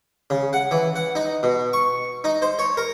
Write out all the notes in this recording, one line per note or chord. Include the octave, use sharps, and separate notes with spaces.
C#3
F#5
E3
F#5
D#4
B2
C#6
D#4
C5
C#5
A#4